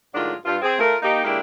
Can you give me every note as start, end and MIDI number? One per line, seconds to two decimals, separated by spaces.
0.14 0.33 45
0.14 0.33 51
0.14 0.33 54
0.14 0.33 56
0.14 0.33 62
0.14 0.33 65
0.45 0.56 43
0.45 0.56 65
0.62 0.76 60
0.62 0.76 68
0.79 0.96 57
0.79 0.96 65
0.79 0.96 70
1.02 1.23 58
1.02 1.23 63
1.02 1.23 67
1.25 1.40 50
1.25 1.40 56
1.25 1.40 58
1.25 1.40 62
1.25 1.40 64
1.25 1.40 67